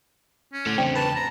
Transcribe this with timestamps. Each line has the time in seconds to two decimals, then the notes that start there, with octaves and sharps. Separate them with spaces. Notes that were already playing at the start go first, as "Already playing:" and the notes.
0.53 C#4
0.66 A2 A4 F#5
0.78 E2 C#3 C4 D4 G5
0.95 B4 A5
1.16 A#5